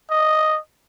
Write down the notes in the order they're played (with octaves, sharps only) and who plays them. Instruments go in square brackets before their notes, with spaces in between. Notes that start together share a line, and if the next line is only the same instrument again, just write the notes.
[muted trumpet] D#5